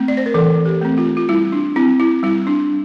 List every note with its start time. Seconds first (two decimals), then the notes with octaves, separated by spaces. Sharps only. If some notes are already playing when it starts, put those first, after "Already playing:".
Already playing: A3 C4
0.08 D5
0.17 C5
0.26 A#4
0.34 E3 A4
0.65 G4
0.81 A3 C4
0.98 F4
1.17 F4
1.29 G3 E4
1.52 D4
1.76 C4 E4
2.00 E4
2.23 G3 E4
2.47 D4